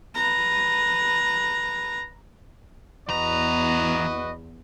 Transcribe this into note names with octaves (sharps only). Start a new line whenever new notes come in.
B4 A#5
E2 E3 F#4 B4 D#5 A#5